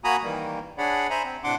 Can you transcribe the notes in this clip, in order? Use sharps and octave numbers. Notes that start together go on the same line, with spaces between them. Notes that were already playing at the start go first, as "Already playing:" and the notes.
A#3 F#4 G#5 A#5 B5 D#6
D#3 E3 G3 A#3
D4 G#4 C#5 D5 F#5 B5
C5 E5 G#5 A#5 B5
C4
A2 C3 D4 F#5 C6 D6